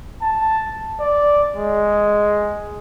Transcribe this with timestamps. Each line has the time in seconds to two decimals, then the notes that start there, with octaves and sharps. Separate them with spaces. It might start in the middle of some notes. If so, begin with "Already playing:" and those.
0.22 A5
1.00 D5
1.56 G#3